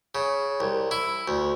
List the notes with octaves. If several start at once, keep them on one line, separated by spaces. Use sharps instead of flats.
C#3
C2
E4
D2